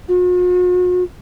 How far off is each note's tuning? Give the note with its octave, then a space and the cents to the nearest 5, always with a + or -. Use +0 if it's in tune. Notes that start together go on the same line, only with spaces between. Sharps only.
F#4 -45